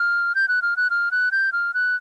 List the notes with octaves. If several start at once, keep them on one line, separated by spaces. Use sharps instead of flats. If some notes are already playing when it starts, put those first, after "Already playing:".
Already playing: F6
G6
F#6
F6
F#6
F6
F#6
G6
F6
F#6